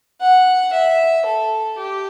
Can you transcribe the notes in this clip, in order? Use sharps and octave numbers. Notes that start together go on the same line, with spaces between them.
F#5
E5
A4
G4